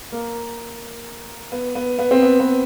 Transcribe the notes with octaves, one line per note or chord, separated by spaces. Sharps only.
A#3
B3
B3
B3
C4
B3
B3